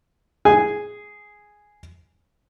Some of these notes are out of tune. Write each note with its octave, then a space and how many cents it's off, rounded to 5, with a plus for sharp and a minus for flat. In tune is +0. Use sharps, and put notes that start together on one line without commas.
G#4 +0 G#5 +0